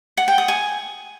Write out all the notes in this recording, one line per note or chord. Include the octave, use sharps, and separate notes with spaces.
F#5
G5
D#6
G#5